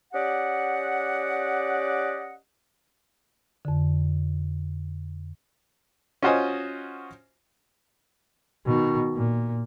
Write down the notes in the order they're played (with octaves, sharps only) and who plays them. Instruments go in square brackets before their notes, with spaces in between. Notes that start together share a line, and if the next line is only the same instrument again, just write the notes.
[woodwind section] C#4 G4 D5 D#5 F#5
[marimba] F2 D3
[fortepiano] C#4 F4 F#4 C5 D#5 G#5
[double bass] B2 D#3
A#2